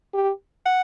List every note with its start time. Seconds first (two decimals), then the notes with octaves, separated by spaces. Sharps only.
0.14 G4
0.66 F#5